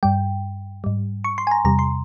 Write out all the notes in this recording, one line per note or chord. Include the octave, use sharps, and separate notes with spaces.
G2 G3 G5
G#2 G3
C#6
C6
G#5
A#5
E2 C3 G3 A#5
C6